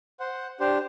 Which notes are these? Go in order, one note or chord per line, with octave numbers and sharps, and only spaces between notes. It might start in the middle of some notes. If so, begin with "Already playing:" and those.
C5 F#5
D4 G4 C5